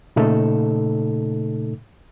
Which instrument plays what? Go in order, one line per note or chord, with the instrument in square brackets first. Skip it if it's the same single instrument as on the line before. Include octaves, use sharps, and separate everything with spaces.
[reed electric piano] A#2 C#3 A3 D#4 A4